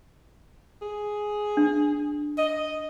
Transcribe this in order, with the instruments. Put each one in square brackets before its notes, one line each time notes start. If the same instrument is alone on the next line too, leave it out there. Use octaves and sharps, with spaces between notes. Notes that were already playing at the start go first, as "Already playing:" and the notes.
[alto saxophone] G#4
[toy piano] D4
[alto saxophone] D#5